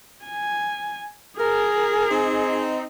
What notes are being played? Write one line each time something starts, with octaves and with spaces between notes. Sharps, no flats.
G#5
G#4 A#4
C4 D#4